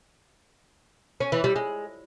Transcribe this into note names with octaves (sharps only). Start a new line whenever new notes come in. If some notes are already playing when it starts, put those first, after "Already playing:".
C#4
E3
G3
G#3